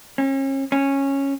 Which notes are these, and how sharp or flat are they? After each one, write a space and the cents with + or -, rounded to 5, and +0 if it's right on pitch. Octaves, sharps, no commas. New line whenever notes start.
C#4 -35
C#4 -10